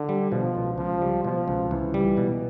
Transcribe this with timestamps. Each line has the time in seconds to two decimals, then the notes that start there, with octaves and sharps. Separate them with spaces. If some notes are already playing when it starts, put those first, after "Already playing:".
Already playing: D3
0.09 G3
0.31 B2 F3
0.55 C#2
0.78 C#2 F3
1.01 G3
1.24 B2 F3
1.48 C#2
1.71 C#2 E3
1.94 G3
2.17 B2